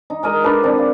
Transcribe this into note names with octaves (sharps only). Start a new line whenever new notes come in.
D#4
G#3 A#4 D#5
D4 A4 B4 D5
C4 D4
F5